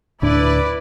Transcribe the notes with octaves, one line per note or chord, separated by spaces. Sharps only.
D2 A2 D4 E4 B4 D5